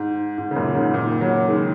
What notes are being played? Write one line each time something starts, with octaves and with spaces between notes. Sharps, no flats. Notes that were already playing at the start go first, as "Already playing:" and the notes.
Already playing: G#2
G#2
C#3
F#2 A#2
G#2 C#3
A#2 D#3
C#3 F#3
D#3 G#3